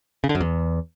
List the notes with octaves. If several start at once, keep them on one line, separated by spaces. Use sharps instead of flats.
C#3
D3
F#2
E2